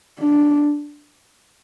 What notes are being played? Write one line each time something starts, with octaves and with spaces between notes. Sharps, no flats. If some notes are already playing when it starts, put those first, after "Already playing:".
D4